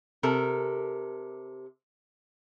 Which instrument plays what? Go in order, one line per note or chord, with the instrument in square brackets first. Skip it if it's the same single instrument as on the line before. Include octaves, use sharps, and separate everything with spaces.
[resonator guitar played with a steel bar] C3 A4 A#4